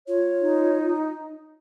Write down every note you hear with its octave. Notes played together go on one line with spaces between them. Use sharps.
F4 C#5
D#4